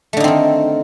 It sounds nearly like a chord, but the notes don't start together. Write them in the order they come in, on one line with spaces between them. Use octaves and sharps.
A3 D3 D#4 C4 D#3